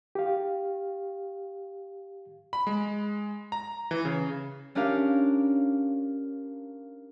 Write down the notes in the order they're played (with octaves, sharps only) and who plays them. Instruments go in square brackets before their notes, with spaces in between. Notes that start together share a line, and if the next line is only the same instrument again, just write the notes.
[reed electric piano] G4 F5
[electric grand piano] B5
G#3
A#5
E3
C#3
[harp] C#4 D4 G4 A#4 F5